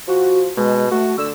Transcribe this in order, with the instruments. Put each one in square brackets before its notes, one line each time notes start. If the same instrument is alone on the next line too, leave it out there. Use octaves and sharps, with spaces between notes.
[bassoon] F3 [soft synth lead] F#4
[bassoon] B2 [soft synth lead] G#3
[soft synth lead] A3 [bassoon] F#4
[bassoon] D3 [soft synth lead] E6